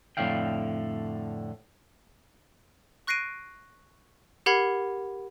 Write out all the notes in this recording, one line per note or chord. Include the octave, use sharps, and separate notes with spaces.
F2 A2 D3 F5 G5
C#6 F#6 A#6 C7 D7 D#7
G4 A#4 F#5 B5 G#6 C7